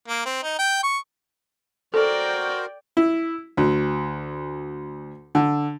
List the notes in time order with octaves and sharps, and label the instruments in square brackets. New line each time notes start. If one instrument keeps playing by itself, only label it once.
[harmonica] A#3
C4
D#4
G5
C#6
[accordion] F#4 A#4 C5 [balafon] A4 [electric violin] D5 G5
[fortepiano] E4
D2
D3